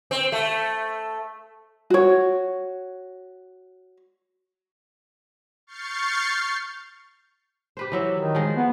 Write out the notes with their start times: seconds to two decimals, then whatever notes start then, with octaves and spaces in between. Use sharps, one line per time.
0.11 C4
0.32 A3
1.90 F#4 C#5
5.67 C#6 F6 G6 A6 C7 C#7
7.77 G4 B4 C5
7.92 E3 F#3 E5
8.17 D#3
8.35 F3 G#3
8.56 B3